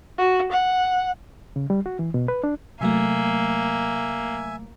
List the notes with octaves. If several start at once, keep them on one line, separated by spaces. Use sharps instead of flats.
F#4
F#5
C#3
G3
F#4
E3
B2
B4
D4
C3 F#3 A3 A#3 E5 G#5